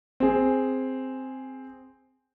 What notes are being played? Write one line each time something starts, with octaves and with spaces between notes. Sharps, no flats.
C4 G#4